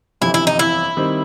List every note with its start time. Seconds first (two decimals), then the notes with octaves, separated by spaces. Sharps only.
0.21 G1 F2 C3 E3 E4
0.34 E4
0.47 D#4
0.59 E4
0.97 D#3 G3 C4